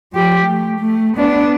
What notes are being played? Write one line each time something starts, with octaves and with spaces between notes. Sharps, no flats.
F3 G4
A3
A3
B3 D4